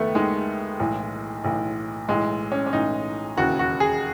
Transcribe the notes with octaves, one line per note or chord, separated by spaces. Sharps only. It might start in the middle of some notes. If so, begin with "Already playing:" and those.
Already playing: D#2 D#3 A3 B3
D#2 D#3 G#3
B1 A2 E3
B1 A2 E3
B1 A2 E3 G#3
C#4
C#4
B1 A2 E3 D#4
E1 D#2 C#3 E3 F#4
F#4
G#4